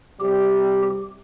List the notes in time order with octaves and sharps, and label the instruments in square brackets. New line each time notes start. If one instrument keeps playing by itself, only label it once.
[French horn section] C3 G3 [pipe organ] G4